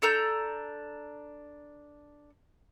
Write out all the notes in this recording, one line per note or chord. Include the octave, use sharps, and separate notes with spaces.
D4 A4 A#5 G6